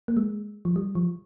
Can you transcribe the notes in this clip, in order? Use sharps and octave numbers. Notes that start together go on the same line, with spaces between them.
A#3
G#3
F3
G3
F3